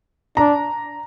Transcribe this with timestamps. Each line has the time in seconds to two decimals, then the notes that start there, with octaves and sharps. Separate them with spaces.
0.37 D4 A#5